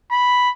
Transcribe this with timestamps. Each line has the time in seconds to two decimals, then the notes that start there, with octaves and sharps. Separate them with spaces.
0.11 B5